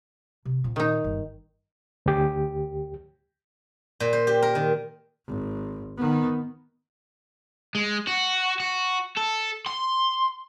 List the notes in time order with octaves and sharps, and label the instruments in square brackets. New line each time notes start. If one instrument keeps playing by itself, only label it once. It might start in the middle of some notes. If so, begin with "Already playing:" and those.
[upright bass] C3
A#2 C4
[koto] D#3 D#4
[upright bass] G1
[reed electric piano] D2 G4
[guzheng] A#2
C5
G4
A#4
D#3
[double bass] G#1
D#3 B3
[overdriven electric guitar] G#3
F#4
F#4
A4
C6